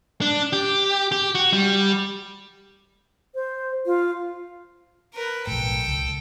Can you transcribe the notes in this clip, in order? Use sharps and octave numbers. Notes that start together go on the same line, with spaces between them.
D4
G4
G4
F#4
G3
C5
F4
A#4 B4
B1 A2 A4 G5
C#2